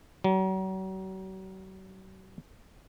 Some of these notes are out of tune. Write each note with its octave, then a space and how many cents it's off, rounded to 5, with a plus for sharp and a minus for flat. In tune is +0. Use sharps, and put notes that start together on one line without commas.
F#3 +40